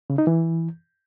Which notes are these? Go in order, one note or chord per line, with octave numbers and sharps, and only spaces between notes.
C#3
D#4
E3